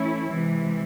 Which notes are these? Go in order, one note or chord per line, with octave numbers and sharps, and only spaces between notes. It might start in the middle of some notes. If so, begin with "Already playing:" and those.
Already playing: E3 A3 C#4 E4
C3 E3 G#3